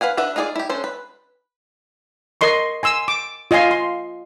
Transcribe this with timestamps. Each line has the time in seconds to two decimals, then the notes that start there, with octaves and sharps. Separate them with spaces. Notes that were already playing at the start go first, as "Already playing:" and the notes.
0.01 B4 F5 F#5 G#5
0.17 D4 B4 E5 F#5
0.36 D#4 F4 G#4 C5 D5
0.56 E4 G4
0.69 C#4 D4 A4 C5
0.84 B4
2.41 A#4 D#5 C6 C#6
2.83 G#5 C6 E6
3.08 D6
3.51 F4 D#5 F5 G#5 C6
3.71 C6